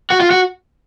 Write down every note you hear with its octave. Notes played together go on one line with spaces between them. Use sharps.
F#4
F4
F#4